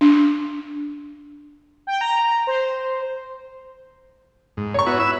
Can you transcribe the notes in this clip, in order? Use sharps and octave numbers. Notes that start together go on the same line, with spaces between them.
D4
G5
A#5
C5
G#2
C#5 C#6
B3 E4 F#4
E5 B5 E6